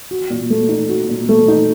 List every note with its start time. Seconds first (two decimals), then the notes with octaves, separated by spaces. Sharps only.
0.11 F#4
0.30 A#2
0.50 A3
0.69 D#4
0.89 F#4
1.08 A#2
1.29 A3
1.48 D#4